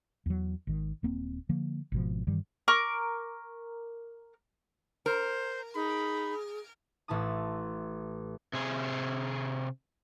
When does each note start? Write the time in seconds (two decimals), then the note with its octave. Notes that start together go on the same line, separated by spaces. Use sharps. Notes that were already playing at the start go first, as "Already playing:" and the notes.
0.26 E2 F#3
0.67 G#1 D#3
1.03 D#1 A#3 C4
1.49 D3 F3 A#3
1.92 G#1 B2 F3
2.27 G2 D#3 E3 G3
2.68 A#4 C#6 D6
5.06 A#4 C5
5.75 D#4 G#4 B5
7.08 A1 A2 E4 A5 D#6
8.53 C3 G#4